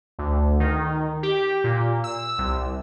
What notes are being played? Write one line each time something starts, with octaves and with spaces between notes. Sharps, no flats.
D2
D#3
G4
A#2
E6
C2